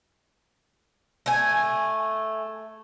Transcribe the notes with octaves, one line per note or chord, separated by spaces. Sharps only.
A3 G#5